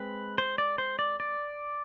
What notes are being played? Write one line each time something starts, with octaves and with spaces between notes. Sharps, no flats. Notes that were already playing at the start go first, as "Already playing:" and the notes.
Already playing: G#3 C4 B4
C5
D5
C5
D5
D5